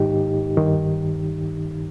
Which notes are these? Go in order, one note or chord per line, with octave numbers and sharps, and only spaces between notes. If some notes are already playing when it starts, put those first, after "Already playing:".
Already playing: G#2 D#3 D#4 G4
G2 D#3